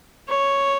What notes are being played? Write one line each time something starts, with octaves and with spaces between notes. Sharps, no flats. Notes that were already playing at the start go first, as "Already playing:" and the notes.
C#5